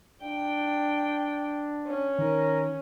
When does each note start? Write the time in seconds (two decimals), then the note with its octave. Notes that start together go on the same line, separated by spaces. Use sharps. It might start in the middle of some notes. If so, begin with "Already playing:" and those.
0.22 D4 G5
1.87 C#4
2.19 D#3 A#4